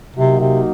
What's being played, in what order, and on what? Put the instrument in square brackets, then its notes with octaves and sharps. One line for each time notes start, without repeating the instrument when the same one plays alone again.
[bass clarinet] C3 [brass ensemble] F#3 A#3 D#4 F#4
[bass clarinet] C3